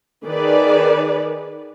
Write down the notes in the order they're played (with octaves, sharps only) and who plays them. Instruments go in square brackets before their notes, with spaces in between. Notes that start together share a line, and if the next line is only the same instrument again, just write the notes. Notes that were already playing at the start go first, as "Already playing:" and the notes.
[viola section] D#3 G#4 B4 D5